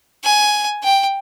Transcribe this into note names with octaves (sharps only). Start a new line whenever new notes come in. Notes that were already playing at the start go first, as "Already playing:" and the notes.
G#5
G5